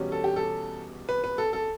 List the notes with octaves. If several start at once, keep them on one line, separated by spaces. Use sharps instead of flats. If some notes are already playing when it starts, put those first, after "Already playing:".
Already playing: E2 B2 G3 C#4
A4
G4
A4
B4
B4
A4
A4